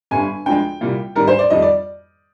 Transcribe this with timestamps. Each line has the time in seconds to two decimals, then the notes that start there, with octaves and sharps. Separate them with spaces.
0.11 G1 G2 D3 G3 G#5
0.46 D2 D3 F3 G#3 G5
0.81 C2 A#2 G3 A#3
1.15 G#2 D#3 G3 A#4
1.28 C5
1.39 D5
1.50 F2 D#3 G3 D#5
1.62 D5